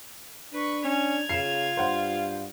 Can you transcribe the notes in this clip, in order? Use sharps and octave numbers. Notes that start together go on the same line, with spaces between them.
D4 B4 C#6
C#4 G#6 F7
C#3 F4 C7 E7
G2 C5 F#5